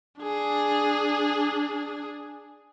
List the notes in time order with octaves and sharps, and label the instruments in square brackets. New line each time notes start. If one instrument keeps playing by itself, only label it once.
[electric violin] D4 G#4